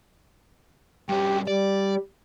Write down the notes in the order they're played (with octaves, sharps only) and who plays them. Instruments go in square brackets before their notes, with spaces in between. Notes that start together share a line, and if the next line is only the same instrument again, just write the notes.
[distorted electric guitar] G2 C#4 [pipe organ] G4
[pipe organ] G3 [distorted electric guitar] D5